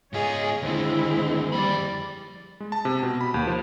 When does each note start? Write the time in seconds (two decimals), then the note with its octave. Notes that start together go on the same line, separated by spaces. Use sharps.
0.13 G#2 F4 G#4 C#5 D#5
0.63 D#2 D3 G#3 C4 E4
1.52 F2 G3 D5 B5
2.60 G#3
2.72 A5
2.85 C3
3.03 B2
3.21 B5
3.34 D#2
3.47 F3